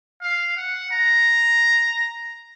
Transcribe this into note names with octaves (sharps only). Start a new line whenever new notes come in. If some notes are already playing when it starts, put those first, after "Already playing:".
F5
F#5
A#5